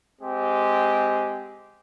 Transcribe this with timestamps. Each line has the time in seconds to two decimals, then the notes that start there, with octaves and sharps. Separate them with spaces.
0.21 G#3 C4 G4